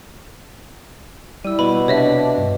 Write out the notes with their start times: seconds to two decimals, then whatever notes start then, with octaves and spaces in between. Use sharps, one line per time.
1.44 G3 E4 E6 D#7
1.59 B2 B5
1.88 C3 D4 C#5 D#5 E5
2.38 G2